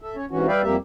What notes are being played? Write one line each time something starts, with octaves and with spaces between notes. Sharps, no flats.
A4 E5
C#4 C#5
G#2 C3 E3 C#4 F#4
G3 B4 D5 E5 F5 G5
F2 G3 A#3 G4 E5